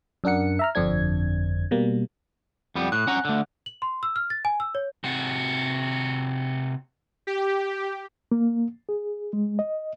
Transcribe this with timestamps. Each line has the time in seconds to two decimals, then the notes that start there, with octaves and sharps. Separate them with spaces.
0.24 F#2 D4 A#4 F#5 C#7
0.59 E5 A#5 F6
0.75 G1 F2 D3 C4 D4 G#6
1.71 B2 G3 A#3
2.75 F2 G3 B3
2.92 A2 F#6
3.07 C#4 F#5 A#5
3.25 D3 A3
3.66 F#7
3.82 C6
4.03 E6
4.16 F6
4.30 A6
4.45 G#5
4.60 E6
4.75 C#5
5.04 C3 F#4
7.27 G4
8.32 A#3
8.89 G#4
9.33 G#3
9.59 D#5